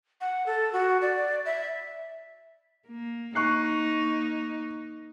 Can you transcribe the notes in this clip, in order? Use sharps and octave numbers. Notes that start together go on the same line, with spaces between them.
F#5
A4
F#4
D5
E5
A#3
A#3 D#4 C#6 F#6 C7